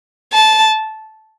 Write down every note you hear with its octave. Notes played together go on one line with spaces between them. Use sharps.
A5